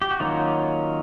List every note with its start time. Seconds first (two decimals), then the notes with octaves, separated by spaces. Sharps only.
0.02 G4
0.11 F#4
0.20 D#3 F#3 A#3 C#4 F4